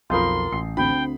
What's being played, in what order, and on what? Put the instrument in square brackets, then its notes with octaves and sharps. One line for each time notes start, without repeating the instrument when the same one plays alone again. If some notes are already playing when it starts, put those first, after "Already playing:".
[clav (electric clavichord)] B1 F2 [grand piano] F4 A#4 [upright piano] B5 D#6 G6 [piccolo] C6
[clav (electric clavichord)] A1 [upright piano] C7
[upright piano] D2 C4 [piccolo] G5 [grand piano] B5